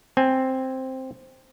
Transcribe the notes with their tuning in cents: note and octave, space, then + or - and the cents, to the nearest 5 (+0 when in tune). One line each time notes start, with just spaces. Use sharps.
C4 +0 G#5 -5